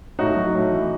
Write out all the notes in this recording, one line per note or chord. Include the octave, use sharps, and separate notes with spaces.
A2 D#4 F#4
F#3
A2
E3